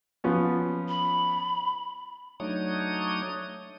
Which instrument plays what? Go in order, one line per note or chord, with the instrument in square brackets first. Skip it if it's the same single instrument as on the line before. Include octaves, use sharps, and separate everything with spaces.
[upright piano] F3 B3 C#4
[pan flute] B5
[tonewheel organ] F#3 A3 D4 D#4 C#5 D#6